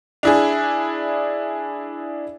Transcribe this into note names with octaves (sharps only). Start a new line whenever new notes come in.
D4 E4 G#4